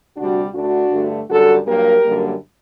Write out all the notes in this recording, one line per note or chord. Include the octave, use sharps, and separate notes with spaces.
D2 C3 G3 D4 F#4
D2 D3 A3 D4 F#4
G2 D3 A3
F#2 D3 G3 F#4 A4
G2 F#3 A#3 G4 A#4
F#2 D3 G3 A#3